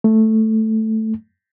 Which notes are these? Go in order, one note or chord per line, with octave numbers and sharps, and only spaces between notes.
A3